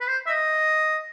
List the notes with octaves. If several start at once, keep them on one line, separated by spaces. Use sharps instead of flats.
B4
C5
E5
D#5